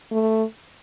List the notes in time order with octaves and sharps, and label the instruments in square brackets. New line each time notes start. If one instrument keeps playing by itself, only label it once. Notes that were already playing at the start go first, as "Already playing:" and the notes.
[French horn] A3